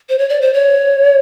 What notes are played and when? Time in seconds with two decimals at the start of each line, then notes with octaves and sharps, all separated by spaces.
0.09 C5
0.19 C#5
0.29 D5
0.41 C5
0.53 C#5